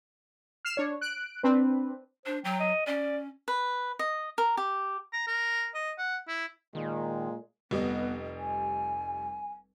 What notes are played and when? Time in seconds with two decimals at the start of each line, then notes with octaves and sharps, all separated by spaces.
0.65 F6 C7 E7
0.77 D4 C#5
1.01 F#6 D7
1.43 C4 D4 B4
2.26 D4 C5
2.44 F#3 G5
2.60 D#5
2.87 C#4 D5
3.48 B4
3.99 D#5
4.38 A#4
4.57 G4
5.13 A#5
5.27 A#4
5.75 D#5
5.98 F#5
6.28 E4
6.75 A#2 D#3 G#3
7.71 F1 G3 B3 D#5
8.38 G#5